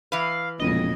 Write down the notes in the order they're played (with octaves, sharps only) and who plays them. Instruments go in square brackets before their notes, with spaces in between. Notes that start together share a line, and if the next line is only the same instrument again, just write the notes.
[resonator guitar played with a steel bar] E3 B4 [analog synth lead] F5
[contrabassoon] E1 [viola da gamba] F2 A#2 C#3 [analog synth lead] D#5